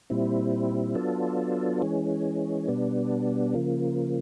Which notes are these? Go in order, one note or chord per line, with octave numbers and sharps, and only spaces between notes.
A#2 G3 C4 E4
F#3 B3 D4 F4 A4
E3 G#3 C#4
B2 G3 B3 D4
C#3 F3 A#3